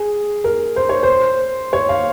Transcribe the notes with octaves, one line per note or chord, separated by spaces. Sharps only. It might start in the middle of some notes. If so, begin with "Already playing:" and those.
Already playing: G#4
A#4
C5
C#5
C5
C#5
F5